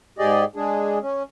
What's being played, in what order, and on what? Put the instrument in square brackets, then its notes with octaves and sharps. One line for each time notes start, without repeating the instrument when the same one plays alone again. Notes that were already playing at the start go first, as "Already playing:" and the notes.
[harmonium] G#2 G4 G#4 D5 D#5
G#3 D4 G#4
C#4